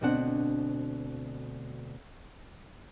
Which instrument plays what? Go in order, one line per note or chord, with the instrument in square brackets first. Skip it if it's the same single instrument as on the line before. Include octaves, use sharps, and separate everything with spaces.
[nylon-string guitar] D2 B2 C4 D4 G#4 F#5